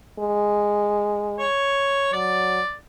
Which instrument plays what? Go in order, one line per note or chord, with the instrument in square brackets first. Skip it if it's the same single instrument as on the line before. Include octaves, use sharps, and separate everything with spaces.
[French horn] G#3
[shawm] C#5
[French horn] F#3 [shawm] D5